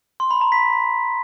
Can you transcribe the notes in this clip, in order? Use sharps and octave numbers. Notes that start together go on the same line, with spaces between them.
C6
B5
A#5
B6